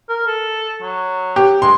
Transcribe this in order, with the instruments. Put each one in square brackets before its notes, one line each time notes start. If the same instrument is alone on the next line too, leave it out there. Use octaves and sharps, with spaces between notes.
[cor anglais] A#4
A4
F#3
[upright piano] G4
[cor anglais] G#3 [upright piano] C6